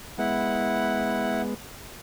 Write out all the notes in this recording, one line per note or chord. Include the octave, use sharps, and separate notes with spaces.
G#3 B3 E4 F#5